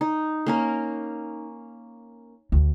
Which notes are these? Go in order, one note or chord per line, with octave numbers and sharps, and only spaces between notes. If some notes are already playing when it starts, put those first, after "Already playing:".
D#4
A#3 C#4 A#4
D2